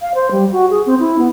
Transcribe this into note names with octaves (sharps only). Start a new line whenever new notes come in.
F5
C5
G3
F#4
G#4
C4
E4
B3